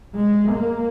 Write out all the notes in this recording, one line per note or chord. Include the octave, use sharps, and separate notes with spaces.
G#3
A#3